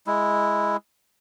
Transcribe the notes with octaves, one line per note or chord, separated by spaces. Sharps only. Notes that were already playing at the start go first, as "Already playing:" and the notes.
G#3 E4